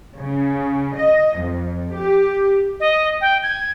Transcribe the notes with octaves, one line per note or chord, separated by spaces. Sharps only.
C#3
D#5
F2
G4
D#5
G5
G#6